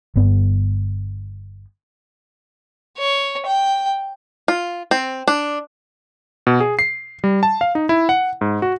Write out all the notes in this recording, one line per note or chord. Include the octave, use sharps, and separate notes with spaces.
G1 G2 B3
C#5
G5
F4
C4
D4
B2
G#4
C7
G3
A5
F5
D#4
E4
F#5
G#2
F#4